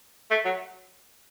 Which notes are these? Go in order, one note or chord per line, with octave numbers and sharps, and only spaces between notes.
A3
F#3